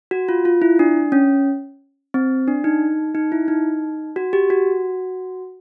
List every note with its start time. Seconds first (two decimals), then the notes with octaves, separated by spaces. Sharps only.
0.11 F#4
0.29 F4
0.45 F4
0.62 E4
0.79 D4
1.12 C#4
2.14 C4
2.48 D4
2.64 D#4
3.15 D#4
3.32 E4
3.48 D#4
4.16 F#4
4.33 G4
4.50 F#4